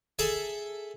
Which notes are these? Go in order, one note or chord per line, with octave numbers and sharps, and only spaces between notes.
G#4 A4 E5 G#5